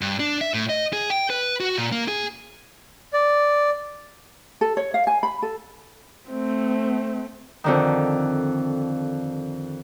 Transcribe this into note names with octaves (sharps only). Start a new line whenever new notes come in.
G2
D4
E5
A2
D#5
G#4
G5
B4
F#4
A#2
A#3
G#4
D5
A4
C#5
F5
G#5
B5
A4
A3 C4
F2 D3 D#3